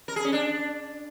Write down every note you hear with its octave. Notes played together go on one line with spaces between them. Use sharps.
A#4
G#4
C#4
D4